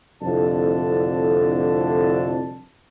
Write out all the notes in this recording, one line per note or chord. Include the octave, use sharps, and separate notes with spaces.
C2 F2 A2 D3 D4 A5